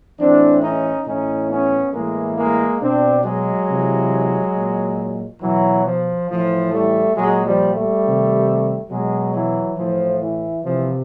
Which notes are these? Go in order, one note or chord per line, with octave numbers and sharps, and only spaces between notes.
A2 E3 C4 D4
C#4 D#4
A2 E3 C#4 D#4
B3 C#4
A2 E3 G#3 A#3
G#3 A#3
B2 C4 D4
F#3 G#3
C3 E3
A#2
B2 E3 F#3
F3
A2 E3 F3
G3 A3
A#2 F#3 G#3
F3 G3
G3 A3
C3 D#3
B2 F#3 G#3
E3 F#3
A2 E3 F3
E3
C3 E3 F3